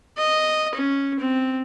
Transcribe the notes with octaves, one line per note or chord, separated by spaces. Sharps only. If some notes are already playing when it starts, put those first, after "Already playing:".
D#5
C#4
C4